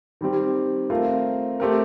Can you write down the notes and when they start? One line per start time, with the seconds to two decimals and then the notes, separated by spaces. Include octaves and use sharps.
0.21 D#3 G3 C4 G4
0.90 A3 C4 F4 A#4
1.60 A3 C4 G4 A#4